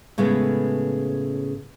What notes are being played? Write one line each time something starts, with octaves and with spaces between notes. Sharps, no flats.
A2 C#3 G#3 A3 B3